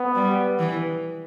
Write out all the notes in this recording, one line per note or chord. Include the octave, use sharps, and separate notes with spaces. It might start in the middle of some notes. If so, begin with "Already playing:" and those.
Already playing: B3
G3
E3